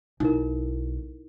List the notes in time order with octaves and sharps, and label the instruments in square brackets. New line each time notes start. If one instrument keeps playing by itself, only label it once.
[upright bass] B1 [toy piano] D#4 E4 A#4